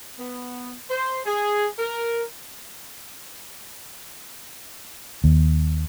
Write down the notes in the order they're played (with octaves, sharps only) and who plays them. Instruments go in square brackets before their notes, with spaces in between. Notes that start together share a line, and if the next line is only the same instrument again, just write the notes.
[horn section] B3
C5
G#4
A#4
[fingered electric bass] D#2